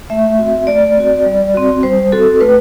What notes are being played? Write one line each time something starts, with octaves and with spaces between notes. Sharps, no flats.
A3 E5
C4 F#4
A3 D5
C4 F#4
G3
C4 F#4
G3 C5
C4 F#4 A4
A3 B4